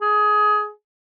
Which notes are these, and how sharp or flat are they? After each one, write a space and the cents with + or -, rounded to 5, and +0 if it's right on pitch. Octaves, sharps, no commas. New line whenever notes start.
G#4 +15